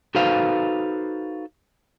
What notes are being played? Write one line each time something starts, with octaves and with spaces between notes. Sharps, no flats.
D#4 F#4 A4 B4 C5 F5